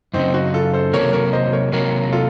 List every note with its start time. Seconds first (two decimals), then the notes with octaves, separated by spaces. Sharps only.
0.14 F#2 C#3 F#3 C4 D#4
0.33 D#4 F#4
0.54 F4 A4
0.74 A4 C5
0.93 C3 F#3 A#3 A#4 C#5
1.13 A#4 C#5
1.33 C5 D#5
1.53 A#4 C#5
1.72 C3 F#3 A#3 A#4 C#5
2.12 F4 A4